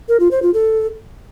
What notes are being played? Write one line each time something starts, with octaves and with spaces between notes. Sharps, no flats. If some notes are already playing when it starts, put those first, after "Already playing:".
A#4
F4
C5
F4
A4